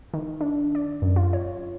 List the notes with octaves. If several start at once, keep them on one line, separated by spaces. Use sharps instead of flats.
D#3
D4
D5
F#2
F4
C#5